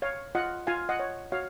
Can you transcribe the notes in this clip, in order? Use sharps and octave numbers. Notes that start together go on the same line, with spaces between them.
C#5 F5
F4 D#5 F#5
F4 F5 G#5
D#5 F#5
C#5
F#4 C#5 F5